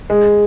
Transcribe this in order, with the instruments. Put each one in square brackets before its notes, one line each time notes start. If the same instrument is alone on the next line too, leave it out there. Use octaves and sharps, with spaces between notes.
[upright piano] G#3